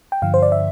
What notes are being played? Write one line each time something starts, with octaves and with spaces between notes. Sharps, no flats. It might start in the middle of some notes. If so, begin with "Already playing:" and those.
G5
G2 D3 F3 F5
C5
D5
E5